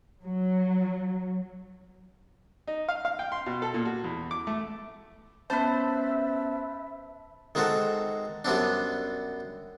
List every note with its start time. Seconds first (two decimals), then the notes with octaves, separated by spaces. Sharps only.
0.24 F#3
2.67 D#4
2.89 F5
3.05 F5
3.19 G5
3.32 C6
3.46 B2
3.62 A4
3.74 A#2
3.85 F#4
4.04 E2
4.31 D6
4.47 A3
5.50 B3 C#4 B4 C5 E5 A5 B5
7.55 D#3 G#3 C4 F#4 A4
8.45 F#2 G3 B3 C4 D4